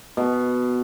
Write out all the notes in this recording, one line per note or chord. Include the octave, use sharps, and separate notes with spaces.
B2